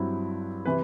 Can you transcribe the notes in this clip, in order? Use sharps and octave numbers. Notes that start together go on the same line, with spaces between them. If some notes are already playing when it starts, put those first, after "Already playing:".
Already playing: G2 F#3 C4 E4
C3 E3 B4